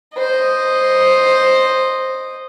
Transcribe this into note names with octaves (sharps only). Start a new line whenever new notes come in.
C5 D#5